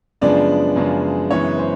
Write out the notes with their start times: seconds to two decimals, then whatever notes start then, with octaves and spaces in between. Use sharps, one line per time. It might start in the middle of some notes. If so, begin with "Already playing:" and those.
0.21 F#2 C#3 F3 G#3 B3 D4 D5
0.76 F#2 C#3 F3 G#3 B3
1.31 F#2 C#3 E3 G#3 B3 C#5
1.58 C5